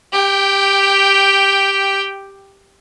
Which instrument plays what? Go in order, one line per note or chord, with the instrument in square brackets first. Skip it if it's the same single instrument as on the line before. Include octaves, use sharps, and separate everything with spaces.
[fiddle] G4 G5